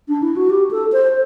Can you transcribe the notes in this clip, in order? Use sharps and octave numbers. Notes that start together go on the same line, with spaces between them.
D4
E4
F#4
G4
A4
C5